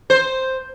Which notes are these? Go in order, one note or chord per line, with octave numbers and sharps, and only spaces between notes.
C5